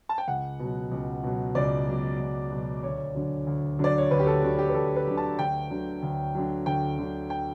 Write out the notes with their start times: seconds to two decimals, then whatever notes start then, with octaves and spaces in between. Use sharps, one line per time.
0.09 A5
0.18 G5
0.27 C#2 F#5
0.59 B2 F#3
0.91 C#2
1.23 B2 F#3
1.55 C#2 D5
1.87 B2 F#3
2.19 C#2
2.51 B2 F#3
2.83 D2 C#5
3.15 D3 F#3
3.47 D2
3.79 D3 F#3 D5
3.98 C#5
4.11 D2 B4
4.19 G4
4.27 A4
4.42 D3 F#3 F#4
4.58 G4
4.69 B4
4.74 D2 A4
4.96 B4
5.07 D3 F#3
5.17 A5
5.38 D2 G5
5.70 D3 F#3
6.02 D2
6.35 D3 F#3
6.66 D2 G5
6.99 D3 F#3
7.30 G5